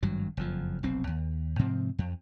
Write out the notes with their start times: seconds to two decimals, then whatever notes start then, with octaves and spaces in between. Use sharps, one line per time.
0.03 G#1 G2 F#3
0.37 F#1 F2 F3
0.83 F1 B1 C4
1.07 D#2
1.59 G#2 C3 F3 C4
1.99 F2